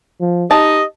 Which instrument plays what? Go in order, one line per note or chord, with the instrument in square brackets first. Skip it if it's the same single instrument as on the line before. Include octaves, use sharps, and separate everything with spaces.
[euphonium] F3
[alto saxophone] D#4 [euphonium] G4 [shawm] D#5 [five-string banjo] A5